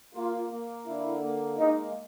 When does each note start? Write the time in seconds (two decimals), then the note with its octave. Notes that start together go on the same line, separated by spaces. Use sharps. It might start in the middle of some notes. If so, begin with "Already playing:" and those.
0.14 A#3 F4
0.50 A#3
0.85 D3 E4
1.21 A#3
1.57 G#3 D#4